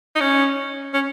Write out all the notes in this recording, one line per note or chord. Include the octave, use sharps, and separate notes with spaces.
D#4
C#4
C#4